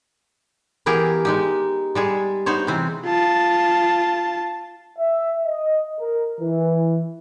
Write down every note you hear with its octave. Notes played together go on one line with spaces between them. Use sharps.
E3 B3 G4 G#4 A#4
G#3 D#4 G4
G3 G#3 G#4
B3 D#4 C5 C#5
C3 E3 C4
F4 A5
E5
D#5
A#4
E3